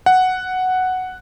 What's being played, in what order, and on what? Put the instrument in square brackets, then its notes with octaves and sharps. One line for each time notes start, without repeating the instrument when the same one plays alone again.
[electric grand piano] F#5